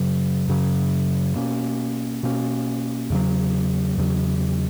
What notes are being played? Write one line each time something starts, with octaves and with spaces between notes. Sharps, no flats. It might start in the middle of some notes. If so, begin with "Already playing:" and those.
Already playing: F#2 C#3 F#3
F#2 C#3 F#3
B2 A#3 C#4
B2 A#3 C#4
E2 C#3 F#3
E2 C#3 F#3